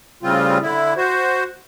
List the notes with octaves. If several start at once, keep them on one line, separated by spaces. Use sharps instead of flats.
A2 C#3 G3 C4 F4
D3 E4
F#4 C5